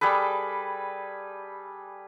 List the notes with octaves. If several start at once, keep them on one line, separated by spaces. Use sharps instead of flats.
G3 G#4 A4 B4